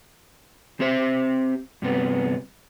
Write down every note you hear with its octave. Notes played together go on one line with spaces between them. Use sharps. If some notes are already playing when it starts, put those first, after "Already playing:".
C4 G4 C5 E5
G2 C3 B3